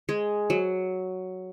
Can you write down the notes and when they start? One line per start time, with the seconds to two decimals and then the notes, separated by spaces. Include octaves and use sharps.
0.09 G#3
0.50 F#3